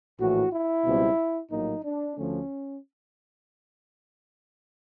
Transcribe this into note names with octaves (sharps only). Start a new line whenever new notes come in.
A#1 A2 E3 F#4
E4
C#2 B2 G3 C4
A#1 A2 F#3 A#3 D#4
D4
D2 D3 F3 A3 C#4